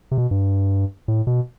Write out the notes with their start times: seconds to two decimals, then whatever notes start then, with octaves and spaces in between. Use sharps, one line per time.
0.11 C3
0.18 B2
0.31 G2
1.08 A2
1.27 B2